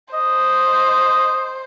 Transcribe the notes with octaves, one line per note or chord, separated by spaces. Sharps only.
C5 D#5